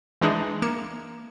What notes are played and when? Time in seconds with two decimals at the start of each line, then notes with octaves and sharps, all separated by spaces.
0.21 E3 G#3 D4 D#4
0.62 A#3 G#6 C#7 E7